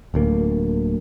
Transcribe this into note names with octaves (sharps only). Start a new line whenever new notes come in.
D1 D2 A#3